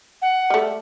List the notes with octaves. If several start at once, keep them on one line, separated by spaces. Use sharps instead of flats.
F#5
G3 A3